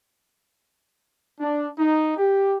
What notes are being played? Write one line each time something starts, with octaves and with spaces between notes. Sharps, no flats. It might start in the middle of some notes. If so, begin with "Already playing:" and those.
D4
D#4
G4